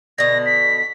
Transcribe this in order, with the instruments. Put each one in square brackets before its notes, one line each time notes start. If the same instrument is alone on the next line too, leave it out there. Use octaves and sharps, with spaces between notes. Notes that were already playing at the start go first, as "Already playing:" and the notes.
[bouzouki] B2 D3 [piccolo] A#6
[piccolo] B6